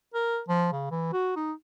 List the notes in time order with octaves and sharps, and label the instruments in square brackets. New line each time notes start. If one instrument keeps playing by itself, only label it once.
[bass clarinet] A#4
F3
C#3
E3
F#4
D#4